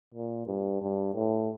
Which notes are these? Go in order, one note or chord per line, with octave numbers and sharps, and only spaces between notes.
A#2
G2
G2
A2